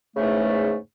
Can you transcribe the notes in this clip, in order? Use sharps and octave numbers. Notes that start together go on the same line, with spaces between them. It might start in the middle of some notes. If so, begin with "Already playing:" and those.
E2 G#2 C#3 A3